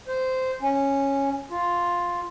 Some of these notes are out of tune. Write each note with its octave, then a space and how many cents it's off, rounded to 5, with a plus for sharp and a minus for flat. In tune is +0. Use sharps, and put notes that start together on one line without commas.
C5 -15
C#4 -5
F4 +5